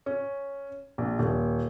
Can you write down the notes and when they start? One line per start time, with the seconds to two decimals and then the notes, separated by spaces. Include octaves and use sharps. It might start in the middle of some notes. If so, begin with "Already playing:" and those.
0.06 C#4
0.98 A#1
1.19 D#1